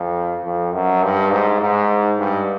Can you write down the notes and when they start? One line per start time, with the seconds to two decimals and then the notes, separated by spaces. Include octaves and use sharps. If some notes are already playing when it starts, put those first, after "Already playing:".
Already playing: F2
0.45 F2
0.74 F#2
1.03 G2
1.32 G#2
1.61 G#2
2.19 G2